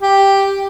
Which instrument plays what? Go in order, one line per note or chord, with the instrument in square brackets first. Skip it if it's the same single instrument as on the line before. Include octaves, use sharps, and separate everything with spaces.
[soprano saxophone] G4